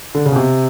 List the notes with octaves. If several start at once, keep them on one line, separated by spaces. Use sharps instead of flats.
D3
C#3
B2
C3